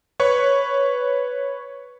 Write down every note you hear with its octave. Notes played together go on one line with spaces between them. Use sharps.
B4 C#5 C#6